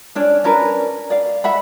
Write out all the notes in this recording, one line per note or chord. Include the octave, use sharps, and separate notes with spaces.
C#4 D4 D5
C#4 D4 A#4 B4
D5 F5
E5 F#5 B5